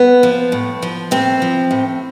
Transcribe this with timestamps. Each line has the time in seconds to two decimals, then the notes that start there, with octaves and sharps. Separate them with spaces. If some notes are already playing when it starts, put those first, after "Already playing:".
Already playing: B3
0.23 F3
0.52 A2
0.82 F3
1.11 A2 C4
1.42 F3
1.71 A2